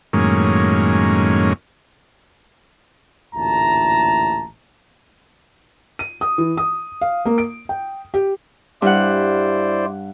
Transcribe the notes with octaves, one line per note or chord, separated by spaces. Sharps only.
F#2 A2 D#3 G#3 A#3 C#4
A1 D2 A#2 E4 A5 A#5
D#7
D#6
E3
D#6
F5
A#3
D7
G5
G4
G2 E4 C5 D5 F#5